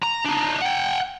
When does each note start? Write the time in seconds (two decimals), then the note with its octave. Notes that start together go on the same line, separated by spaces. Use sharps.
0.03 A#5
0.26 D4 D#4
0.62 F#5 G5